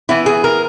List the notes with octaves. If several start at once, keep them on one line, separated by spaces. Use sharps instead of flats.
E3 B3 E4
G#4
A#4